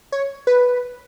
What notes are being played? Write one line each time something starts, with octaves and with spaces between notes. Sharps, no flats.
C#5
B4